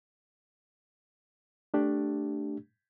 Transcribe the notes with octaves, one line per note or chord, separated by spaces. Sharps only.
A3 D4 G4